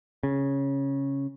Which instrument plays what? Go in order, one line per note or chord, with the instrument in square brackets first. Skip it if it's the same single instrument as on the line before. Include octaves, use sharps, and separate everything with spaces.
[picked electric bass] C#3